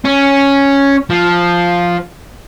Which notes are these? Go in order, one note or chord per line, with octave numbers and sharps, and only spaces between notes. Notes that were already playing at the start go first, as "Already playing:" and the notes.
C#4
F3